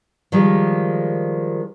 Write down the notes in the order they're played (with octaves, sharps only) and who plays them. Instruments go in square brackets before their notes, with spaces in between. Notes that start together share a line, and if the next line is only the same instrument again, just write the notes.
[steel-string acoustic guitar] D#3 F3 G3 G#3